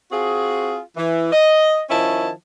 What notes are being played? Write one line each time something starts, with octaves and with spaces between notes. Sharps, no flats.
C4 F4 F#4 G#4
E3
D#5
D#3 F3 C#4 E4 A5